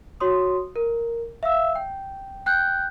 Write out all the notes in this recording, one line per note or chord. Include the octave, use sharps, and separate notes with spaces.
F#4 C#5 C6 D#6
A#4
E5 F5 E6
G5
G5 F#6 G6